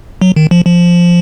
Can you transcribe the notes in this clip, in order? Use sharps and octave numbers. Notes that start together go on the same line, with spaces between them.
F#3
D#3
F3
F3